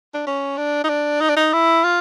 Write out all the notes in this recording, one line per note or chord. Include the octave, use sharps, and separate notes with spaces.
D4
C#4
D4
D#4
D4
D#4
D4
D#4
E4
F4